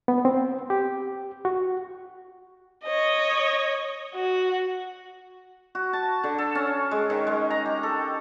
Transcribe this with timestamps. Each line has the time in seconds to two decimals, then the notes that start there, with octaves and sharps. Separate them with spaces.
0.08 B3
0.25 C4
0.70 G4
1.45 F#4
2.84 C#5 D#5
4.15 F#4
5.75 F#4
5.93 A5
6.24 D3
6.38 A4
6.55 C#4
6.91 G#3
7.10 D#3
7.27 G#3
7.50 A#5
7.66 G4
7.83 A4